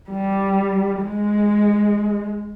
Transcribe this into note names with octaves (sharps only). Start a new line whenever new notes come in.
G3
G#3